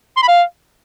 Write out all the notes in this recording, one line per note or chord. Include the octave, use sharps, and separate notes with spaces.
C6
B5
F5